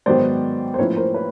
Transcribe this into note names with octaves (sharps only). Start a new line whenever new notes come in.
G#2 D#3 F#3 B3 C5 D5
C5
A2 F3 A#3 C#4 E4 B4 C#5
A#4 C5
B4 C#5